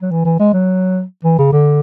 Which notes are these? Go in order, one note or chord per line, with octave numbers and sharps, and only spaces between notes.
F#3
E3
E3
G#3
F#3
E3
C#3
D3